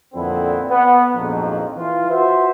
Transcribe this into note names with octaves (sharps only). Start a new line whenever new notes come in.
F2 A#2 D3 B3 C4 E4
B3
A#1 F2 G#2 D#3 F3 F#3
E3 F4
F4 F#4 B4 C5 E5